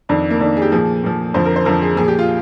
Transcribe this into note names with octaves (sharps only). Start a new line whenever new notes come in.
F2 D#3 D4
A#3
F2 D#3 D4
G#4
G4
A#2 F3 G#4
A#2 F3
F2 D3 F3 C5
A#4
C5
F2 D3 F3 A#4
G#4
A#2 F3 G#4
G4
F4